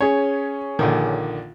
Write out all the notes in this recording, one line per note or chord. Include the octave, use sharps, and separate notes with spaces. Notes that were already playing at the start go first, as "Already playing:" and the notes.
C#4 G#4 C#5
A#1 D3 D#3